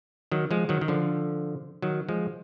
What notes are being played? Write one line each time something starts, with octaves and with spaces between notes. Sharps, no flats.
D#3 F#3
F3 G#3
D#3 F#3
D#3
D3 F3
D#3 F#3
F3 G#3